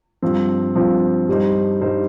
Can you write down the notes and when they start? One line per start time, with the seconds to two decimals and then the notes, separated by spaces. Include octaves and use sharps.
0.22 G2 F3 C4
0.75 G2 F3 C4
1.28 G2 G3 D#4 C5
1.81 G2 G3 D#4 C5